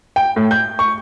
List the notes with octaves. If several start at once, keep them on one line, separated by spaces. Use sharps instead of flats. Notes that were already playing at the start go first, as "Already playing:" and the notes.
G5
A2
G6
C#6